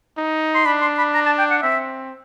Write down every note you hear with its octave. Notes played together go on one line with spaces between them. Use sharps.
D#4
C6
D4 B5
C6
B5
A#5
A5
G5
F#5
C4 E5